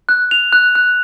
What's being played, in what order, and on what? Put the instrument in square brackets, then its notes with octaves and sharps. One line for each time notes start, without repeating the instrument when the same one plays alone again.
[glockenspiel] F#6
F7
F#6
F#6